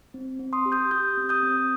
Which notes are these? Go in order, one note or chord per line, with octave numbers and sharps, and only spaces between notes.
C4
C4
C6 D#6
G4
D#6 G6
G4 D#6 G6
C4
D#6 G6
C4